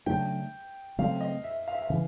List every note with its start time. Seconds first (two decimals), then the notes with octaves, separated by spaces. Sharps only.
0.06 C#3 F#3 A3 D4 G5
0.98 C#3 F#3 A3 C4 F5
1.21 D#5
1.44 E5
1.68 F5
1.74 E5
1.82 F5
1.90 C#3 E3